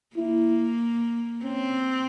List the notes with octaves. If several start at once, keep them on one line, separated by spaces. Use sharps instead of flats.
A#3 E4
C4 C#4